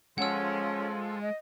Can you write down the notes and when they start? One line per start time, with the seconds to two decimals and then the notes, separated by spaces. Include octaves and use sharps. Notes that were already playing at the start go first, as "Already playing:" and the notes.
0.18 F3 G#3 C#4 F4 A4 F#5 E6
1.22 D#5